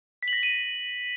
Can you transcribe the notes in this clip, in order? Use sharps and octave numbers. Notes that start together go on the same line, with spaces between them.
B6
F#7
A#6
F#7
D#7